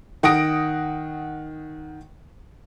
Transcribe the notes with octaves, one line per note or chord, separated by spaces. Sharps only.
D#3 F#5 D#6 A#6 D7